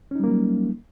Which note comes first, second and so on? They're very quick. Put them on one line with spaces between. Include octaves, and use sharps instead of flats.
C#4 D#4 G3 A#3 F#3